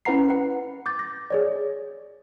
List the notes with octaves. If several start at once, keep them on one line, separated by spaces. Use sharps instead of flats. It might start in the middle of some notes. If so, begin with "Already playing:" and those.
C#4 E4 B4 F#5 A#5 C7
B4 F#5
D6 G6 A6
A#6
G#4 C#5 D5